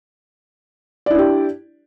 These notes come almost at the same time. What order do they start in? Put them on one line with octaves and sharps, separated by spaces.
D5 E4 D4 G4